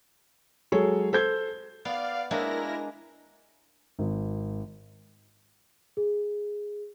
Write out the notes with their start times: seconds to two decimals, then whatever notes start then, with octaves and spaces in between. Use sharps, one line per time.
0.72 F#3 G#3 G#4 A4 C#5
1.13 A4 C5 G6 G#6
1.85 B3 D5 F5
2.31 G#3 A#3 D4 E4 A#4 A#6
3.99 G#1
5.97 G#4